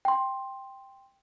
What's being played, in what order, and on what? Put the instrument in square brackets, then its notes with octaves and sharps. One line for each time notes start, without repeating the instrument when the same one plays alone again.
[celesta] G5 C6